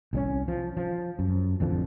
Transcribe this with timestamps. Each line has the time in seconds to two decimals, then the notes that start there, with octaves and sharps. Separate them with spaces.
0.13 C2 G3 C#4
0.48 F3
0.77 F3
1.19 F#2
1.60 A1 F2 D3 F3